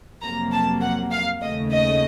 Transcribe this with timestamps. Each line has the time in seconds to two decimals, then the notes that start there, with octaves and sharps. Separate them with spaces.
0.22 F2 C3 F#3 A#3 A#5
0.52 A5
0.82 F#5
1.12 F5
1.42 D#2 C#3 A3 D#5
1.72 D#5